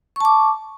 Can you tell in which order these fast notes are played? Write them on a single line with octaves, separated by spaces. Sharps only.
C#6 A5 D6